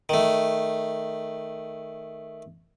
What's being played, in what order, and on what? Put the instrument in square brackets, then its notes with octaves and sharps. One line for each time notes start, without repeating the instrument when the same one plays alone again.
[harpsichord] D#3 A3